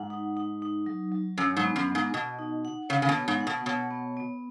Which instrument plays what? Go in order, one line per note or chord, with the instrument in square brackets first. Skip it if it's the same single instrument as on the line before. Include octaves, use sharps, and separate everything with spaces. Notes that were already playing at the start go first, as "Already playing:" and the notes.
Already playing: [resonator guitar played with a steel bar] G#2 [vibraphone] F#5
[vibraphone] D#4
D#4
D#4
F#3
F#3
[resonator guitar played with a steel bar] F#2 [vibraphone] C#5
[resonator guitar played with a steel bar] G#2
[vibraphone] B3
[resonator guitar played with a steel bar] F#2
[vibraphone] B3
[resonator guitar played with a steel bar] G#2
[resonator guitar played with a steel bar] B2 [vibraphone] D#5
[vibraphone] D#4
F#5
[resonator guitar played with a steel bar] C#3 [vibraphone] C#5
[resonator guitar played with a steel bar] C#3
B2
[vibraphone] B3
[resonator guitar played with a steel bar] G#2
[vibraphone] F#5
[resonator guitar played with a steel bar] B2
[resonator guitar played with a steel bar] B2 [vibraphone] C#5
[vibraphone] B3
B3